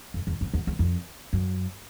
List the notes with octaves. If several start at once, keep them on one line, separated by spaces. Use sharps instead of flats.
F2
E2
F2
E2
E2
F2
F#2